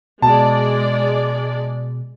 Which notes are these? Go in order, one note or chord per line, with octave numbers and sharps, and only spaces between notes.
B2 G#3 D5 A5